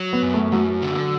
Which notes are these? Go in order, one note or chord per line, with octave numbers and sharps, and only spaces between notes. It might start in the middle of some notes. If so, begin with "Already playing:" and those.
Already playing: F#3
B3
F#2
A3
F#2 F#3
D3